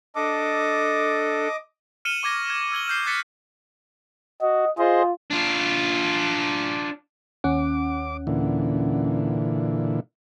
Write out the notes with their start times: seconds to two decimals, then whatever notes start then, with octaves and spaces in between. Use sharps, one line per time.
0.15 D4 A4 D#5 D6
2.05 F6 C#7 D#7 E7 F#7 G7
2.23 C#6 D6 G#6 A#6
2.50 G#6
2.72 E6 G#6 F#7 G7
2.88 F6 G6 C7
3.06 D6 F#6 A6 B6 C#7
4.42 F#4 D#5
4.78 F4 G#4 C5 D#5
5.30 D4 F4
7.44 D#2 C#4 F#5 D6
8.27 A#2 D3 E3